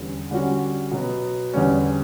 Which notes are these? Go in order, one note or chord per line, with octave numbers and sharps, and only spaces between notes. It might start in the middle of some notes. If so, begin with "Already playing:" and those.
Already playing: E2 D3 G3 C#4
D3 G3 C#4 F#4
B2 F#3 B3
E2 D3 G3 C#4